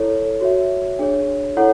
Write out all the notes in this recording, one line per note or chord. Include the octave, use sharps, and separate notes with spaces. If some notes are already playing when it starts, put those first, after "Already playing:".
Already playing: E4 A4 C#5
F#4 C#5 E5
D4 G#4 C#5
E4 A4 C#5 F#5